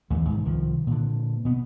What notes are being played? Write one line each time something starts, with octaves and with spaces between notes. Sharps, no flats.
A1 D#2 E3 A3
G#2 C3
C2 D#3 F3
A#2 D3
B2 B3